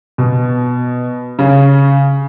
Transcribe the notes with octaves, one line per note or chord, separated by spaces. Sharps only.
B2
C#3